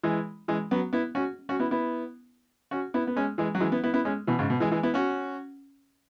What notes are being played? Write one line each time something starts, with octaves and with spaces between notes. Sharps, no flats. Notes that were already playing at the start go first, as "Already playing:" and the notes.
E3 G#3
E3 G#3
F#3 B3
B3 E4
C#4 F#4
C#4 F#4
B3 E4
B3 E4
C#4 F#4
B3 E4
B3
G#3 C#4
E3 G#3
F#3
E3 G#3
B3 E4
B3 E4
B3 E4
G#3 C#4
B2 E3
G#2 C#3
B2
E3 G#3
E3 G#3
B3 E4
C#4 F#4